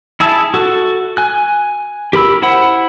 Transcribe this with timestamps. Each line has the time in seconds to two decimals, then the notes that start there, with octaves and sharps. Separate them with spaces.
0.20 E4 G#4 E5 A5
0.54 F#4 A4
1.17 G#5 F#6
2.13 G4 A#4 B5 E6
2.42 E4 C5 F#5 B5